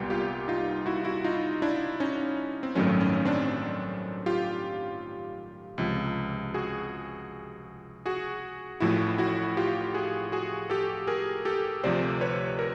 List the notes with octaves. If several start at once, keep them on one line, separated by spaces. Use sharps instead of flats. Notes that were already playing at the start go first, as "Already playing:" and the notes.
Already playing: C2 A#2 G3 B3 F4 G4
F4 G4
D#4 F4
E4 F#4
E4 F#4
D#4 F4
D4 E4
C#4 D#4
C4
A1 G2 D#3 F#3 A3 C#4
C#4
C4 D4
F4 G4
C#2 C3 F3
F#4 G#4
F#4 G#4
A1 A2 F3 A3 E4 F#4
E4 F#4
F4 G4
F#4 G#4
F#4 G#4
G4 A4
G#4 A#4
G4 A4
D2 C3 F3 C5 D5
B4 C#5
A#4